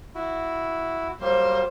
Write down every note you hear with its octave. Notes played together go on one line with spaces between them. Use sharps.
E4 F#4
F#3 G3 A#3 C5